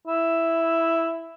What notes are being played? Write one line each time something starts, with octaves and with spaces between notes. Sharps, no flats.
E4